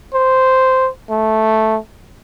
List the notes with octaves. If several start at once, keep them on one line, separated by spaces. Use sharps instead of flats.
C5
A3